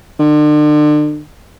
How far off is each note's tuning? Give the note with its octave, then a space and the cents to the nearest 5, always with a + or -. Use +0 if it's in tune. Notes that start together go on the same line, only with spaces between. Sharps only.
D3 +35